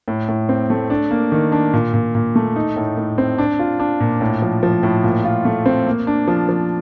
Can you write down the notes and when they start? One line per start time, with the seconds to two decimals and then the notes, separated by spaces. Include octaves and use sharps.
0.08 A2
0.28 A2
0.49 C4
0.70 A3
0.90 D4
1.11 A#3
1.32 D#3
1.52 D4
1.73 A#2
1.94 A#2
2.15 A#2
2.36 A3
2.56 D#4
2.76 A2
2.97 A2
3.18 C4
3.38 D4
3.59 F4
3.79 D4
4.00 A#2
4.21 A2
4.42 F3
4.63 F3
4.83 A2
5.04 A#2
5.25 F4
5.45 A3
5.66 C4
5.87 A#3
6.07 D4
6.27 F3
6.49 F3